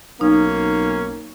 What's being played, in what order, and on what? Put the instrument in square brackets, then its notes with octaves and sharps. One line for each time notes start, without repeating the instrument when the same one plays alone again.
[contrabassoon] B1 [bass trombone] A#3 [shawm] C#4 [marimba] D#4